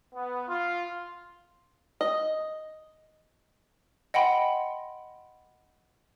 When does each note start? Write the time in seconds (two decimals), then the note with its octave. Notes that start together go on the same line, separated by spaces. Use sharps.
0.14 B3
0.48 F4
2.01 D#5
4.14 D#5 F#5 G5 B5 C6